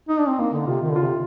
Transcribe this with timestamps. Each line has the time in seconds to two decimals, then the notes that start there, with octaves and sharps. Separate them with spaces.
0.08 D#4
0.19 D4
0.28 C4
0.38 A#3 D#4
0.53 D3
0.67 C3 F4
0.82 D#3
0.92 D3 F4
1.03 C3